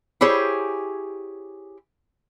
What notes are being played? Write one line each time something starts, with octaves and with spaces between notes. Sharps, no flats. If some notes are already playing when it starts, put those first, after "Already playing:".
E4 G4 G#4 C5 C#5